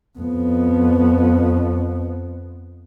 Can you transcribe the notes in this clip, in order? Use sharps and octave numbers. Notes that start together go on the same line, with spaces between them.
F2 B3